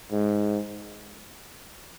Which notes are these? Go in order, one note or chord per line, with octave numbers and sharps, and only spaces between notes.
G#2